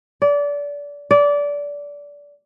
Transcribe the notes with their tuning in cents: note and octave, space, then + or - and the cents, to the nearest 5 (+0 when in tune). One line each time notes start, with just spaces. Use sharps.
D5 -25
D5 -20